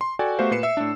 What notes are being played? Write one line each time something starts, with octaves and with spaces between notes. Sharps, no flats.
C6
F#4 A4 D5 G5 G#5
A3 B3 F#4 G4 C5 F5
A#2 B4 C7 C#7 E7
E5 E6
A2 D4